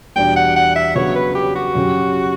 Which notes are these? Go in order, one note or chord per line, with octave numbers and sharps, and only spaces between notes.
E2 B2 G3 D4 G5
F#5
F#5
E5
C#3 F#3 B3 D4 C#5
B4
G4
F#4
F#2 C#3 F#3 C#4 G4